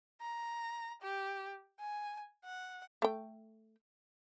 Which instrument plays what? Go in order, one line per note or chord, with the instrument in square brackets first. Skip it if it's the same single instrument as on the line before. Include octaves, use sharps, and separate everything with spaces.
[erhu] A#5
G4
G#5
F#5
[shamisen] A3 G5